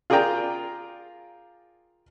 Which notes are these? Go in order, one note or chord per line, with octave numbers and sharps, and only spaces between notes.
F4 G#4 A#4 D5 G5 A#5